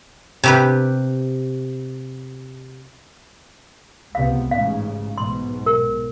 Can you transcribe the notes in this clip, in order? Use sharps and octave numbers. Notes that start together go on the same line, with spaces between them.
C3 G4 B4
C#2 C3 B3 F5
A1 G#2 C#3 F5
B1 G#2 B2 C6
A#4